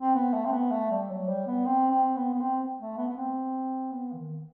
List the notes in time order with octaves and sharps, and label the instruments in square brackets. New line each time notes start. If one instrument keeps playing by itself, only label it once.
[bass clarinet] C4
B3
A3
C4
B3
A3
G3
F#3
G3
B3
C4
C4
B3
B3
C4
A3
B3
B3
C4
B3
E3
D#3